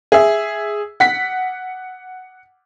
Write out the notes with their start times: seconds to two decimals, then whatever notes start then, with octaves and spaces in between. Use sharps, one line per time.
0.12 G#4 E5
1.00 F#5 B6